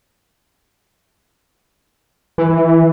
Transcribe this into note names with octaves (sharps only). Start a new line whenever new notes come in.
E3